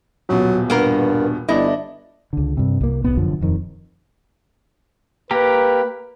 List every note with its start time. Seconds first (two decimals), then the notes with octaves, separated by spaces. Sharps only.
0.29 D#1 B2 F#3
0.70 G2 A#3 B3 A#4
1.49 G1 D4 E4 D#5
2.33 C#2 D3
2.57 G2 C3
2.81 C2 A#3
3.04 D1 B1 B3
3.16 F1 F#2 D3 F3
3.41 D#1 F2 D#3
5.31 A#3 G4 A#4 B4